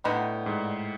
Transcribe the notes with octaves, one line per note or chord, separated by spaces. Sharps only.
A2 D3 G3 B3 D#4
G#2